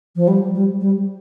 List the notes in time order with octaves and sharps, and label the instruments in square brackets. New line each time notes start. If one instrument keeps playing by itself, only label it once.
[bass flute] F3
G3
G3
G3